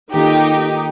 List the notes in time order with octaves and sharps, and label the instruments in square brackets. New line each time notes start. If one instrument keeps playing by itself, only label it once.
[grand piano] D#3 A#3 F4 A4 [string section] D#4 G4